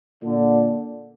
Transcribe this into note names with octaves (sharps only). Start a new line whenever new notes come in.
A#2 D3